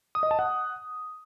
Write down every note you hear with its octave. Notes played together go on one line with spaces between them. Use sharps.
D#6
D#5
A5
F#5